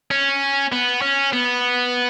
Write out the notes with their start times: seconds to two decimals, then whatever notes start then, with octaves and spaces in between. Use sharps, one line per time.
0.11 C#4
0.72 B3
1.01 C#4
1.33 B3